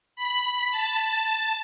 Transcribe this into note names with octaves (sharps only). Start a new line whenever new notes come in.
B5
A5